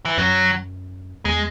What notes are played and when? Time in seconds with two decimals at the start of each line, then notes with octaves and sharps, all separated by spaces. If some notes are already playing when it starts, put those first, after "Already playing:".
0.05 E3
0.17 F#2 F#3
1.25 E2 G#3